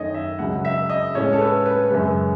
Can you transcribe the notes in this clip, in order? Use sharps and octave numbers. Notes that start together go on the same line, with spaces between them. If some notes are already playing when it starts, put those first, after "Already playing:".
Already playing: F#2 D#3 A3 C#5 D#5
E5
C#2 C#3 F#3 F#5
E5
D#5
A2 G#3 C#4 C#5
A4
B4
B4
F#2 C#3 G#3 B4